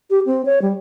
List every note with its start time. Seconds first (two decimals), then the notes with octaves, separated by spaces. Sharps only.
0.10 G4
0.26 C4
0.45 C#5
0.62 G3